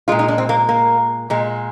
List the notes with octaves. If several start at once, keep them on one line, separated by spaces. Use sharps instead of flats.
A#2 G#3 F4
D#4
D4
C4
A#3
A#3
A#2 G#3